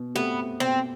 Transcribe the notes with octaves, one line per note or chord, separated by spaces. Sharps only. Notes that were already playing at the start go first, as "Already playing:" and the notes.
Already playing: B2
A3 B3 C4 G4
B2 C4